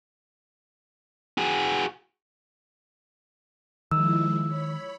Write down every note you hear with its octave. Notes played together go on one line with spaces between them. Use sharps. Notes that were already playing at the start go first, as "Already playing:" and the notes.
F#4 G#4
D#3 F3 G#3 E4 E6
C#5 B5